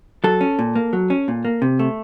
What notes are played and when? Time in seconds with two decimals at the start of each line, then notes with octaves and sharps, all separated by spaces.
0.24 F#3 A4
0.41 C#4
0.59 A#2
0.76 A#3
0.93 F#3
1.10 C#4
1.28 A#2
1.45 A#3
1.62 C3
1.79 A3